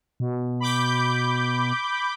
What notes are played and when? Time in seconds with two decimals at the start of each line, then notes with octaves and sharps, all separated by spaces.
0.20 B2
0.60 B5 D6 G6